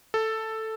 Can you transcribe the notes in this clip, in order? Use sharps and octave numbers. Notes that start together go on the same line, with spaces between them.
A4